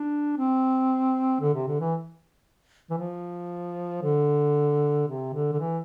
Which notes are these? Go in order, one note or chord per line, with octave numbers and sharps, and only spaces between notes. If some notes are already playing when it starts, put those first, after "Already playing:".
Already playing: D4
C4
D3
C3
D3
E3
E3
F3
D3
C3
D3
D3
E3